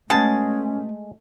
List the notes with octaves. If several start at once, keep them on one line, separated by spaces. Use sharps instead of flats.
B2 G#3 A3 C#4 G#4 A5